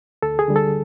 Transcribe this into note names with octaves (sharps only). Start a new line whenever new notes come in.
D2 A4
G#4
D3 G3
A4